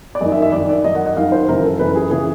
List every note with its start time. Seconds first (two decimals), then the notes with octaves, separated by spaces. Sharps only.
0.15 D5
0.21 F#2 D#3 D#5
0.32 E5
0.42 E5
0.52 F#2 D#3 D5
0.69 D5
0.84 F#2 D#3 D#5
0.95 F#5
1.06 F#5
1.17 F#2 D#3 F5
1.32 C5
1.48 F#2 C#3 E3 A#4
1.64 A4
1.79 F#2 C#3 E3 B4
1.96 G#4
2.11 C#3 E3 G#4